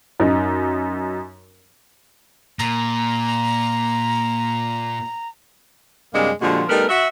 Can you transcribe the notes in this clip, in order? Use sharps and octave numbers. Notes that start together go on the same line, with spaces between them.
F#2 D#4
A#2 A#5
F#2 C3 G3 G#3 A#3 D4
A#2 D3 F3 G3 G#3 F#4
G3 A3 B3 D#4 A#4
F#4 E5